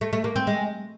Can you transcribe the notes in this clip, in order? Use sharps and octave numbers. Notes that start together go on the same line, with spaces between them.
A3
A3
A#3
C4
G#3